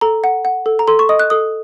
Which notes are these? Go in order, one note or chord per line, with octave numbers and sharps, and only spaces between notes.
A4 A#5
F#5
F#5
A4
A#5
A4 C6
C#6
D#5 D#6
F#6
A4 D#6